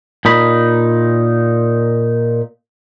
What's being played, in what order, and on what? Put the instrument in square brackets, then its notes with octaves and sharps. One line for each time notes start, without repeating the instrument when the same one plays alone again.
[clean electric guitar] A#2 D#4 B5